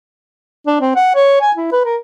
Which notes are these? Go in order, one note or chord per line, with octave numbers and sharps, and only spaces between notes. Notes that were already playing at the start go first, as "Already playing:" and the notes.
D4
C4
F#5
C#5
G#5
E4
B4
A#4